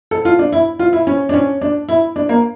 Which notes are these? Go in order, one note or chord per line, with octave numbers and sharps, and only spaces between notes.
A4
F4
D4
E4
F4
E4
C#4
D4
C#4
D4
E4
D4
A#3